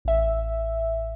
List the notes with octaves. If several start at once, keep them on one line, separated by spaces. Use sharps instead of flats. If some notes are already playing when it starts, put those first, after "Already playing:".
A1 E5